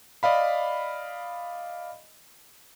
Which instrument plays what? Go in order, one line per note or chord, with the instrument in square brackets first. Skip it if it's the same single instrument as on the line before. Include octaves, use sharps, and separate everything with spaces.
[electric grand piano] D5 D#5 F5 B5